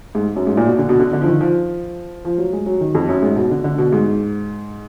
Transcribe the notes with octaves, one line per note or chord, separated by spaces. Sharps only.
G#2
F#2
G#2
A#2
B2
D3
B2
D3
D3
F3
D#3
F3
F3
F#3
G#3
F#3
D#3
F2
F#2
G#2
B2
D3
D3
B2
G#2